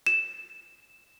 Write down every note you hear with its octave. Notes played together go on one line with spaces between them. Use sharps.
E7